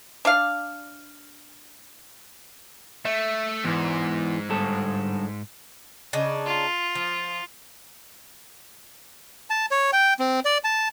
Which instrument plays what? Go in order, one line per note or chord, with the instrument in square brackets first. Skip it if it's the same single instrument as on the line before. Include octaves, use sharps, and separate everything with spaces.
[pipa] D4 D5 F5
[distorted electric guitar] A3 [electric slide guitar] E5
[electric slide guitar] E2 E3 [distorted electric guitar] G#2
[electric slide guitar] G2 A4
[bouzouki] C#3 D4 D#4
[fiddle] F4
[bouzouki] F3
[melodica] A5
C#5
G5
C4
D5
A5